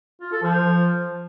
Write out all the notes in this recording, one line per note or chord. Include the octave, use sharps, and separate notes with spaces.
F4
A4
F3